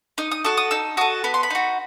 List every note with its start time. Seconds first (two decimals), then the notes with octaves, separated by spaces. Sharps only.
0.18 D#4 D#6
0.31 D#6
0.44 F#4 A4 D#6
0.57 D#6
0.71 D#4 E6
0.97 F#4 A4 D#6
1.24 B3 B5
1.34 C6
1.43 B5
1.50 D#4 F#4